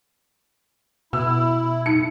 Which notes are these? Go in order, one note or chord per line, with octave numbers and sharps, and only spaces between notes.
B2 E4 E6
D#4 C#7